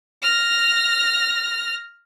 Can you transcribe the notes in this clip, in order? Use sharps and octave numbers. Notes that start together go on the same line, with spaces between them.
F6 A#6